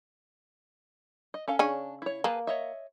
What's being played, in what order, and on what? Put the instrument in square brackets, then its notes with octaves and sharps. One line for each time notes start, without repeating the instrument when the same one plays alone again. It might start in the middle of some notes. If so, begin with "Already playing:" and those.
[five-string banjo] D#5
C#4 A4 F5
[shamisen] C#3 C#4 [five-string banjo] D4
[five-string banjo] E4 C#5
[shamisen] A#3 [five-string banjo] G#4 B4 A5
[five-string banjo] C#5 D#5 E5